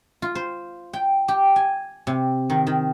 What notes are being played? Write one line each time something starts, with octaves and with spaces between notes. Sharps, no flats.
F4
C5
G5
G4
G#5
C3
D#3
D#3